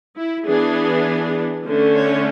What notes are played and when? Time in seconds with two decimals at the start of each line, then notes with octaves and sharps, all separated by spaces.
0.17 E4
0.46 E3 B3 D4 G#4
1.65 D3 A3 C#4
1.95 C#5